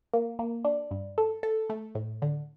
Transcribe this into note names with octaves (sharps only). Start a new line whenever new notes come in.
A#3
A#3
D4
G2
A4
A4
A3
A2
D3